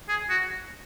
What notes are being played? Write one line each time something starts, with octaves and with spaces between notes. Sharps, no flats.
G#4
F#4